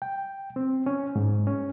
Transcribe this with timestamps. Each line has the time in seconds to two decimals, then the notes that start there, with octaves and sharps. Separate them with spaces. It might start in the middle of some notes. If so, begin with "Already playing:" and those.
0.02 G5
0.56 C4
0.86 C#4
1.16 G#2
1.47 C#4